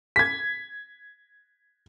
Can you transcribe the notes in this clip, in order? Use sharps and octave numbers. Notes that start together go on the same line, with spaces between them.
G#6 B6